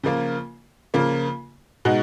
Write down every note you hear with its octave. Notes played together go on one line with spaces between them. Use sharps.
C#3 F3 A#3 F4
C#3 F3 A#3 F4
B2 G#3 D#4 F#4